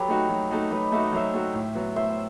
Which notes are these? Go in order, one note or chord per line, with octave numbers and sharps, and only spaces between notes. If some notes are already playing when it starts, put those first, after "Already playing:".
Already playing: F#3 G4 A4 B4
A3 D#4 F#4
F#3
A3 D#4 F#4
F#3 B4 D#5
A3 D#4 F#4 E5
D#5
F#3 C5 E5
A3 D#4 F#4
A2
F#3 B3 F#4
A2 C5 E5